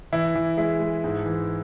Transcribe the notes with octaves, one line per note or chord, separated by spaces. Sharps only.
E3 E4
E3
G#3 E4
G#3
G#2
E3